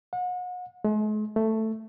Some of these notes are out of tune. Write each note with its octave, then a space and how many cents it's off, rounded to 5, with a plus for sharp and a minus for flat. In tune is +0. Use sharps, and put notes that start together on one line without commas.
F#5 -35
G#3 +45
A3 +5